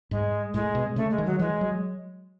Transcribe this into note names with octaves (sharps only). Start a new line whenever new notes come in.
G#2 G#3
A2 G#3
B2
C#3 A3
G#3
D#3
F#3
E3 G#3
F#3